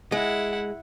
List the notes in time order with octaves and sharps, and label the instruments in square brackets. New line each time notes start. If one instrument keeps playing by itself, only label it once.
[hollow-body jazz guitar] G#3 [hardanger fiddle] E4 F#5